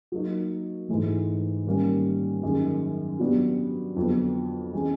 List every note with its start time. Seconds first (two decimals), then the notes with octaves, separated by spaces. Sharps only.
0.12 F#3 A#3 D#4
0.89 G#2 E3 A3
1.66 D#3 G3 A#3 C#4
2.43 F#2 D#3 G#3
3.19 F#3 B3 D4 G4
3.96 F2 D3 F#3 B3
4.73 E3 G#3 C#4